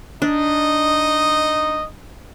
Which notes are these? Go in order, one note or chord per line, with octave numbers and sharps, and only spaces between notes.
D4 D#4 D#5